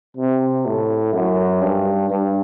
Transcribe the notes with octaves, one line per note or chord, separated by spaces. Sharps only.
C3
A2
F#2
G2
G2